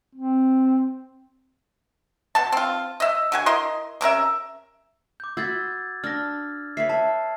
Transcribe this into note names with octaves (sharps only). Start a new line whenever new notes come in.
C4
B2 A5
C4 F4
D#5 E5
D3 F#4 G#5
E4 A#4 D#5 C6
C3 C#4 A#4 E5
D6 G6
F#4 B5 C6 E6 G#6 A6
D4 F6 A#6
B4 C#5 E5 C7
E5 A5